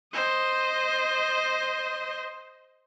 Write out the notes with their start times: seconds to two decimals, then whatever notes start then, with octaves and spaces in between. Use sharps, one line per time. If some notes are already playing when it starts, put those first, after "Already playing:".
0.14 C5 D#5